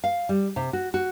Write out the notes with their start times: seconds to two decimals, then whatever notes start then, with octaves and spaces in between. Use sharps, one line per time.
0.04 F5
0.29 G3
0.56 C3
0.73 F#4
0.94 F#4